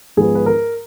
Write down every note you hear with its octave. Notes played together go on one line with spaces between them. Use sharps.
G#2 F3 G#3 B3 G#4
B4
A#4